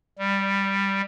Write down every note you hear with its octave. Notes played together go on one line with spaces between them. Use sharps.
G3